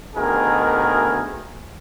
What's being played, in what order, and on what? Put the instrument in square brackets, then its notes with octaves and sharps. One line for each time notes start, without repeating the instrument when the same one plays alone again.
[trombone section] D2 B2 D#3 G#4 A#4